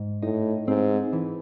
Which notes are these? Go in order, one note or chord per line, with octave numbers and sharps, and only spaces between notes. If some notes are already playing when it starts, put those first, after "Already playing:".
Already playing: G#2
A2 D#4
G#2 C4
E3